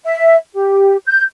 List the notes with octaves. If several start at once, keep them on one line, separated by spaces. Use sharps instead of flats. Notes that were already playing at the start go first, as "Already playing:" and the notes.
E5
G4
G6